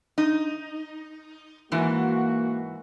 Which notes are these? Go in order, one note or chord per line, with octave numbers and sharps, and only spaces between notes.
D#4
G#2 E3 A#3 F#4